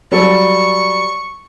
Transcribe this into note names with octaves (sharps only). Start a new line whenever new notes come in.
F#3 G3 A4 C#6